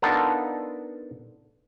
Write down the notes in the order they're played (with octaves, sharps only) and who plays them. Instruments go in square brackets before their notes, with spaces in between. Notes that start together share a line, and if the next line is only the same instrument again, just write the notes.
[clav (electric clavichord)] B3 D4 D#4 F4 A4 A#4